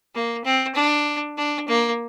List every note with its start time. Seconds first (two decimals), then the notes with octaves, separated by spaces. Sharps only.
0.15 A#3
0.44 C4
0.75 D4
1.37 D4
1.68 A#3